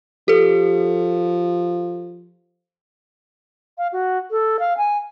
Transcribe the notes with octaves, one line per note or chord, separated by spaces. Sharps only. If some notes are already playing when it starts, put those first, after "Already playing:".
F3 G4 A4
F5
F#4
A4
F5
G#5